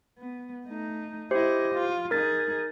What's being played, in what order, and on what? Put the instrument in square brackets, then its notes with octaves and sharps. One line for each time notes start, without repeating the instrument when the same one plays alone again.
[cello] B3
A3 D#4
[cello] E4 D#5 [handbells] G4 C5
[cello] F4
[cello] D#4 G#4 [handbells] A#4 A6